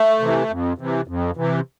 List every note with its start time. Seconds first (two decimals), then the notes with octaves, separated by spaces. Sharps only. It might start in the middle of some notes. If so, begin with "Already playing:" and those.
Already playing: A3
0.19 C3 E3
0.50 F2
0.78 C3 E3
1.08 F2
1.36 C3 E3